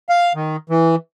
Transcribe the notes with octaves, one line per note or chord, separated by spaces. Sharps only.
F5
D#3
E3